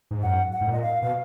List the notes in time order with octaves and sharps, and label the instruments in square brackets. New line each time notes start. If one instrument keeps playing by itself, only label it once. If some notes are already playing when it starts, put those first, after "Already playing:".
[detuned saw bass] G#2
[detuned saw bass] F#2 [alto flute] F#5
[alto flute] F#5
[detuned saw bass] G#2
[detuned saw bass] A#2 [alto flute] D#5
[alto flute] F5
[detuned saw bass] B2 [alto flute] F5